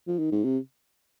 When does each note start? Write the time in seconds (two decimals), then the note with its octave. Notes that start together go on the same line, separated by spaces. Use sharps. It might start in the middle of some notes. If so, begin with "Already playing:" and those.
0.08 F3
0.19 D#3
0.32 G#2
0.44 C3